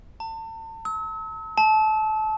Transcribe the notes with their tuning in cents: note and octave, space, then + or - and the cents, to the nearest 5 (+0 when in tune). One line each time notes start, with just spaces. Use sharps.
A5 +35
E6 -40
A5 -25